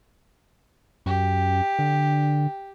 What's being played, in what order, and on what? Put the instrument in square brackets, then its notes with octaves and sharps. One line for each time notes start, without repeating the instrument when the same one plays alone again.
[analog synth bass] F#2 [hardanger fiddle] G4
[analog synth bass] D3